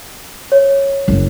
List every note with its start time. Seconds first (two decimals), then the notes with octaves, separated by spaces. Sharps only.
0.52 C#5
1.08 F#1